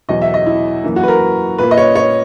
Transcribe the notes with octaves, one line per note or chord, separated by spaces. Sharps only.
E2 B2 F#3 D#5
E5
D#5
E4
F#2 E3 A#3
F#4
B4
A#4
A#2 A#3 B4
D#5
C#5
C#5